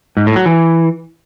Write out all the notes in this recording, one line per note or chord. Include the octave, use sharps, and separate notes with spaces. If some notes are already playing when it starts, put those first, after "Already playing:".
G#2
A2
F#3
E3